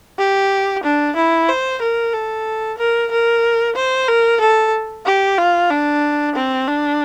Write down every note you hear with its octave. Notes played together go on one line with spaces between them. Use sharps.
G4
D4
E4
C5
A#4
A4
A#4
A#4
C5
A#4
A4
G4
F4
D4
C4
D4